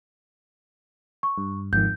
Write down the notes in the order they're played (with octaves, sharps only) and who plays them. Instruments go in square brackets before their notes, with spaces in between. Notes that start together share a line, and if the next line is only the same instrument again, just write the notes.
[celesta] C#6
[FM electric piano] G2
[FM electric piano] G#1 F2 D#3 [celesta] G6